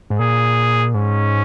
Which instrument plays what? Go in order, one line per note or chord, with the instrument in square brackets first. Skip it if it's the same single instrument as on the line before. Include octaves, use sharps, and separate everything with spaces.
[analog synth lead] G#2
[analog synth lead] A#2 [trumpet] G#4
[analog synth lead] G#2 [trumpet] C#4